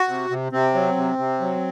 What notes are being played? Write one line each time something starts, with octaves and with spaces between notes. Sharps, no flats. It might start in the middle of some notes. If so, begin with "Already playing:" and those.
Already playing: F#4
C3
C3
C3 C4
F#3
C3
C3
F#3